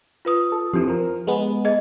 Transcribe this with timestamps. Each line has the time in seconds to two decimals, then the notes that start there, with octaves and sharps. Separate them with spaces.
0.25 F4 B4 D#6
0.52 A4
0.73 F2 E3 D4 G4
0.88 F3 A#4
1.27 G#3 B3
1.65 G#4 D#5 G#6